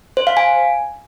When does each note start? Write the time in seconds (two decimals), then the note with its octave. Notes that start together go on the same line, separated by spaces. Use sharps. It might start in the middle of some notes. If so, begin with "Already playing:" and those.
0.17 C5
0.27 F5
0.37 G#5